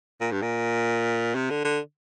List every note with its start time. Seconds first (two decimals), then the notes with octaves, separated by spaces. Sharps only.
0.21 A#2
0.32 G2
0.42 A#2
1.35 C3
1.50 D3
1.65 D3